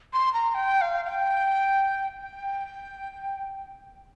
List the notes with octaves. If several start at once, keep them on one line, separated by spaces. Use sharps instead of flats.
C6
A#5
G5
F5
F5
G5
G5